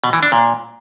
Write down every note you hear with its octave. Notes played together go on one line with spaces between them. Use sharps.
B2
E3
D4
A#2